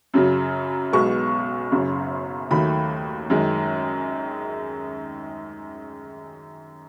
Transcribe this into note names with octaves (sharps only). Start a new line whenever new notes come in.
F#2 C#3 F#3
B1 B2 G#3 B3 C#6
F#1 F#2 C#3
D#2 D#3 F#3 A3 B5
F#2 D#3 G#3